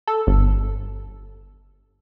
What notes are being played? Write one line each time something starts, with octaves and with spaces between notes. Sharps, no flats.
A4
G1